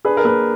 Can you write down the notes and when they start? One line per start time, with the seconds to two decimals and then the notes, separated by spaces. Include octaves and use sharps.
0.05 D4 G#4 B4
0.17 A#4
0.24 A#3 G#4 B4